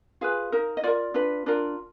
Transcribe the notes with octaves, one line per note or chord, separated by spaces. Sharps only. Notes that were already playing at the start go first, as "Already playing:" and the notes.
F4 G#4 B4 F5
D#4 A#4
D#5
F4 A#4 D5
D4 F4 B4
D4 F4 A#4 D5